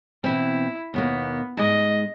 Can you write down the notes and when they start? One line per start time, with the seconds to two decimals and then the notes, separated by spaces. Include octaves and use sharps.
0.24 B2 E3 C4 E4
0.94 D#2 B2 A#3 B3
1.57 G#2 G#3 D#5